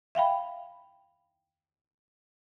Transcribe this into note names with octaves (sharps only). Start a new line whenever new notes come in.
E5 F5 G5 B5